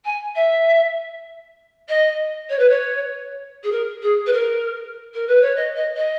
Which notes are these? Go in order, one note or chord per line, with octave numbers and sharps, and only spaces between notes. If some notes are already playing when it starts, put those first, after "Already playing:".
G#5
E5
D#5
C#5
B4
C#5
G#4
A#4
G#4
B4
A#4
A#4
B4
C#5
D#5
D#5
D#5